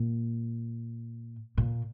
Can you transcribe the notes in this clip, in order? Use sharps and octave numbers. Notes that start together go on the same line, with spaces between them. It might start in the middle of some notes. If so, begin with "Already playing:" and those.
Already playing: A#2
A#2